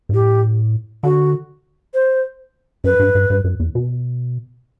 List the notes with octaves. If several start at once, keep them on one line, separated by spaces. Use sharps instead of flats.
G2
A2 G4
D3 F#4
C5
F#2 B4
G2
G2
G2
F#2
E2
B2